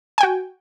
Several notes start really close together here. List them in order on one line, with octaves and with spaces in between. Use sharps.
G#5 G5 F#4